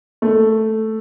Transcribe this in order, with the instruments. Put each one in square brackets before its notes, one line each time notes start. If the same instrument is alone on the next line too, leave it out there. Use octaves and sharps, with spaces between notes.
[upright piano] A3